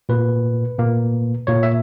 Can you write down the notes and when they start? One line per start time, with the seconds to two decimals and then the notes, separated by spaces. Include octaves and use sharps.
0.09 A#2 A#3 B4
0.79 A#2 A#3
1.47 A#2 A#3 C#5
1.63 E5